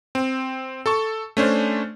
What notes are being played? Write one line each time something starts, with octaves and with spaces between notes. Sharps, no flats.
C4
A4 A5 C#6
A3 C#4 D4 C5